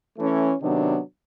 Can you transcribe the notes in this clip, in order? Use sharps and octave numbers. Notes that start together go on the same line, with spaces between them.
E3 A3 C#4
C3 D#3 F#3 B3 D4